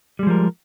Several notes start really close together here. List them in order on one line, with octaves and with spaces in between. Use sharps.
G3 G#3 F3 A#4